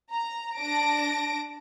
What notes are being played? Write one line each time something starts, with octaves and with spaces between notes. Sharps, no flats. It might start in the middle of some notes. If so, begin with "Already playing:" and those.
A#5
D4 A5 A#6 D7